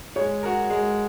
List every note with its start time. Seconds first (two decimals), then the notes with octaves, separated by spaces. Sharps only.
0.16 G#3 C#5
0.43 F#4 A#4
0.70 G#3